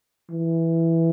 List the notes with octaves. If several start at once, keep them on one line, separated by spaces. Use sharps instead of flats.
E3